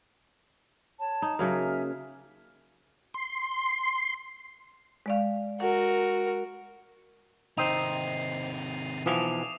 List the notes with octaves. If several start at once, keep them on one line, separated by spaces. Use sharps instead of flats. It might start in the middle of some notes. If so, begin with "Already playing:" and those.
C#5 A5
D#4
C#3 F#3 A#3 E5 G#5 F6
C6
G#3 D5 F5
F#4 A#4 F#5
C3 D#3 C4 D#4 C7 D#7 F7
B1 E3 F3 D6 D#6 F7